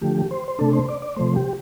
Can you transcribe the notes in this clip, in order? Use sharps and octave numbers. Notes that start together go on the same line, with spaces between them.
D3 F3 A3 G4
C5
C5
C3 A3 D4 A4
C5
D5
D5
C3 F3 A3 C5
G4